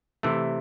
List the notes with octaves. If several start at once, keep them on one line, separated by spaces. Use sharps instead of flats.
C3 E3 A3